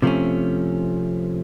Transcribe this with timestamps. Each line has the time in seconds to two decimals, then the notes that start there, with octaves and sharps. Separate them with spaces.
0.02 C3 F3 A3 C#4